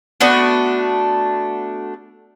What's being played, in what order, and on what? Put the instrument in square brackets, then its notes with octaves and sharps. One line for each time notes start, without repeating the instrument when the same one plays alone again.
[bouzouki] A3 B3 D4 F#4